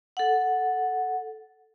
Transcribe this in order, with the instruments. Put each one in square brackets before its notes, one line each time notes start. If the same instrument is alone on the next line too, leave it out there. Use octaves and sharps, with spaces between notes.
[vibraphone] A4 F#5